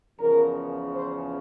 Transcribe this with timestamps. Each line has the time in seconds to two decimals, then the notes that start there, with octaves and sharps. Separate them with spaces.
0.18 E2 C#3 F3 A#4
0.94 C5